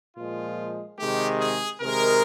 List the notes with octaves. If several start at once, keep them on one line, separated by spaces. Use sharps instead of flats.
A#2 F3 G#3 F4
C3 D#3 G#3 G4
G#4
C3 D#3 G#3 A#4